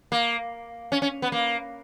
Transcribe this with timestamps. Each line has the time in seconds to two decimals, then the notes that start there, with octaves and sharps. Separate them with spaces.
0.12 A#3
0.92 C#4
1.02 C#4
1.22 B3
1.32 A#3